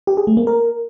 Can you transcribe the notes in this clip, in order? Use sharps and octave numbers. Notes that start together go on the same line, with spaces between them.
G4
G#4
A3
A#3
A#4